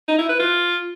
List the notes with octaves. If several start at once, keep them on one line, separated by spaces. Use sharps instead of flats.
D#4
E4
B4
F4